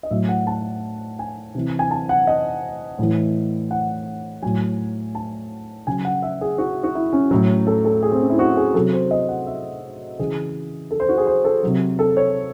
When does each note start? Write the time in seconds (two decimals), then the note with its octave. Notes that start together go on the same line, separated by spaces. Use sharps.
0.03 D#5
0.11 A2 F#3 E5
0.29 F#5
0.47 A5
1.19 G#5
1.55 C3 E3
1.79 G#5
1.91 A5
2.09 F#5
2.27 D#5
2.99 A2 E3
3.71 F#5
4.42 A2 F#3 G#5
5.15 A5
5.87 C#3 F#3 G#5
6.05 F#5
6.22 E5
6.41 G#4
6.58 F#4
6.83 F#4
6.95 E4
7.13 C#4
7.31 A2 F#3
7.67 A4
7.85 A4
8.03 G#4
8.12 C4
8.21 C#4
8.30 E4
8.39 F#4
8.57 G#4
8.74 C3 F#3 A4
8.92 C5
9.11 D#5
9.29 F#5
9.46 E5
10.19 C#3 E3 G#4
10.91 A4
11.00 C5
11.09 F#4
11.18 G#4
11.27 C5
11.44 A4
11.63 C3 F#3
11.99 A4
12.17 C#5